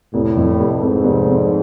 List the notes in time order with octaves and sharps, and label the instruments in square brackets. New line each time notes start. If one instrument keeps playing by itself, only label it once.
[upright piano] F1 [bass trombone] A2
[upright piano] F2
F1
[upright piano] F1 [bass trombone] G#2
[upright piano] F1
F1